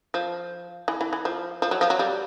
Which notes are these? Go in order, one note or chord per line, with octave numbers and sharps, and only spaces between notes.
F3
E3
E3
E3
F3
F3
F#3
F3
F#3
G3